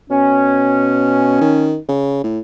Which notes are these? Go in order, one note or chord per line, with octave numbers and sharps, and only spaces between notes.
B2 C#4
D#3
C#3
A2